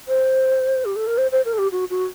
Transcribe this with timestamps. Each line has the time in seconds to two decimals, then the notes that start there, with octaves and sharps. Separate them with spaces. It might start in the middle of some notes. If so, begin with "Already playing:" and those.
0.08 C5
0.85 G4
0.96 A4
1.07 A#4
1.18 C5
1.32 C5
1.45 A#4
1.53 A4
1.58 G4
1.72 F#4
1.90 F#4